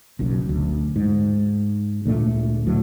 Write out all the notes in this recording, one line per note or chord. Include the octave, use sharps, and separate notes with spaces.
F#1 B1 F#2
D2
G#2
D2 A#2 G#3 A3
D2 A2 F#3